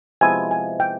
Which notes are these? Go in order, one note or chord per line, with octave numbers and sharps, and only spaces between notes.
C3 F3 G#3 B3 E4 G#5
G#5
G5